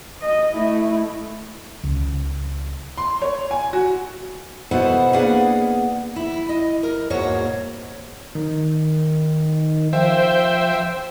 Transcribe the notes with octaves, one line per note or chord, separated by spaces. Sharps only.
D#5
A3 E4
C#2
C6
C#5
G#5
F#4
B2 B3 E4 A4 C5 F#5
A#3 B3 D4 G#4 F5 F#5
E4
D#5
A#4
E2 G#2 B2 A#3 F#4 C#5
D#3
F3 C5 E5 G5